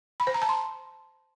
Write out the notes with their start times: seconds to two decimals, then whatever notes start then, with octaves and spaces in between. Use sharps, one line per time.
0.20 B5
0.27 C5
0.34 A#5
0.42 A5
0.49 C6